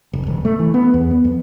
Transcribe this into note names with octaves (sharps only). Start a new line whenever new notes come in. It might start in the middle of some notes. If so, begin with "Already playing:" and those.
F1
D#1
A3
E3
B3
E2
B3
F2